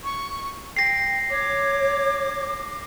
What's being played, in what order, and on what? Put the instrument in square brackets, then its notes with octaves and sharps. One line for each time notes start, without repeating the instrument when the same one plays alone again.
[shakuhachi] C#6
[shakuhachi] G5 [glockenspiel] A#6 C7
[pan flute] C#5 [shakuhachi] D6